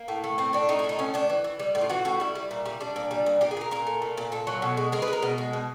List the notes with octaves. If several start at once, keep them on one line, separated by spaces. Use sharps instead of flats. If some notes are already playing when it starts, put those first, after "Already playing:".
Already playing: A#3
A2
A3
A2 C4
A2 D4
A2 D#4
E4
A3 D#4
A2 C#4
A2 D4
E3
E3
G3
A2
F4
E3 F#4
A2 F#4
G3 E4
G3
A#2
G3
G3 D4
A#2
G3
A#2
A#2 G4
G#4
A#2 A#4
A#2 A#4
A3
A#2
A#2
A#2 A4
F#3
B2
G#3
G#3 A#4
B4
G#3
A#4
B2
G#3
B2